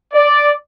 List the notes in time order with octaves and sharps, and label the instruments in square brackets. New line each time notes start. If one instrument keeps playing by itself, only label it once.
[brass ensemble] D5